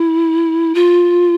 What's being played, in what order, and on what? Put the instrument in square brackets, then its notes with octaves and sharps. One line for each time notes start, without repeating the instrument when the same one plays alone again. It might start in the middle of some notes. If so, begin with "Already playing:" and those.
Already playing: [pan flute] E4
F4